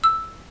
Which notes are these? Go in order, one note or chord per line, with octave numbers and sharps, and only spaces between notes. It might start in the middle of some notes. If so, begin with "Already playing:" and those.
E6